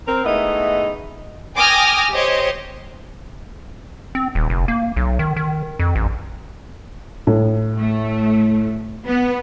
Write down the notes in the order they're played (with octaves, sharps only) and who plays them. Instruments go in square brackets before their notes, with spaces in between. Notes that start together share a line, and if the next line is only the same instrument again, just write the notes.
[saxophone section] C4 A#4
G#3 A3 B3 D#4 E4 D#5
[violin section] G5 G#5 D6 D#6 F6 A#6
G4 C5 C#5 D#5
[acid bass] C4
D#1
F1
A#3
B1
D#3
D#3
F2
A1
[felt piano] A2
[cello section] A3
B3